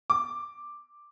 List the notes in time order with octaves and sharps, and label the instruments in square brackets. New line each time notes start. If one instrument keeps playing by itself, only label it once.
[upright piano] D6